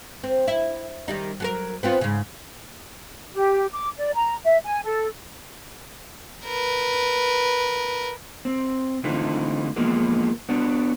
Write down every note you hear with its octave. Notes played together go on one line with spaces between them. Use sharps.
C4
E4
D#3 G3 D#4
F#3 A4 A#4
B3 C4 F4
G#2 C#3
G4
D6
D5
A#5
E5
G#5
A4
A#4 B4
C4
D3 E3 A3 C4 D#4 F4
E2 F3 G#3 A#3 B3
B3 D4 F#4